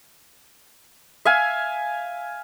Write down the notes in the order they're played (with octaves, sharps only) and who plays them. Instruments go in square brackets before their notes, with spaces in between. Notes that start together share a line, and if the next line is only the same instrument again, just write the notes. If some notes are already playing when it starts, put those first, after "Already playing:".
[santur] E5 F5 G#5